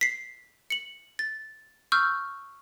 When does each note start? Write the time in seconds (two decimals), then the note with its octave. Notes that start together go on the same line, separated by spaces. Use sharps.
0.01 B6 C7
0.70 C#7 F#7
1.19 A6
1.92 C#6 E6 F6 G6